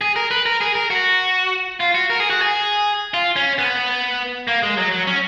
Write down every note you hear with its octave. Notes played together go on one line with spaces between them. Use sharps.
G#4
A#4
B4
A#4
G#4
A#4
F#4
F4
F#4
A#4
G#4
F#4
G#4
F4
C#4
B3
A#3
G#3
F#3
F#3
C#4